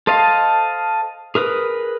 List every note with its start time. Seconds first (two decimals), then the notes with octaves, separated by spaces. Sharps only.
0.07 A4 C5 D#5 F5 A5
1.35 G#4 A#4 B4 D#6